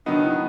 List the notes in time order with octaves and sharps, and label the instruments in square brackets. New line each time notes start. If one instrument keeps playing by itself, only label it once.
[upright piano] D#3 F#3 B3 D#4 [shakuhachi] D4
[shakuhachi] E4